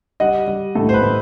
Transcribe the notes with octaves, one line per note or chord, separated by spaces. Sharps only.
G3 D#5 F#5
G3
A2 A4
C5
B4
A2